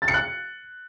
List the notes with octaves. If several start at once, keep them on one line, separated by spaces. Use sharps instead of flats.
A6
C#7
F#6